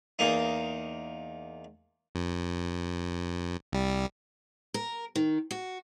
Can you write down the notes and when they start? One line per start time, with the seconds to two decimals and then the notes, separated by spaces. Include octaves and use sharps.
0.19 E2 A#3 D#4
2.15 F2
3.72 C2 G3
4.74 A#4
5.15 D#3
5.51 F#4